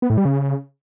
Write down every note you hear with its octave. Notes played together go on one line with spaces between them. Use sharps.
B3
A2
G3
C#3